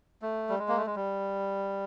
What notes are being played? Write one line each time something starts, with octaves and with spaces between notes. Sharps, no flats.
A3
G3
G#3
A#3
A3
G#3
G3